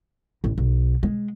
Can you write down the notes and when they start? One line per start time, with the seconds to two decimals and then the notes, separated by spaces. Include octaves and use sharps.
0.44 A1
0.58 B1
1.03 G#3